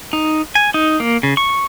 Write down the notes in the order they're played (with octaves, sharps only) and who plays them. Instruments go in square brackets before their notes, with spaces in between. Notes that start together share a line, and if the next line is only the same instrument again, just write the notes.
[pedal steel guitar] D#4
G#5
D#4
A#3
C#3
C#6